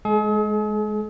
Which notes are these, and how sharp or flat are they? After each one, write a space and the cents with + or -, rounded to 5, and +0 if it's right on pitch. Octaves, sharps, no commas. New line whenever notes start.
G#3 +15 G#4 +45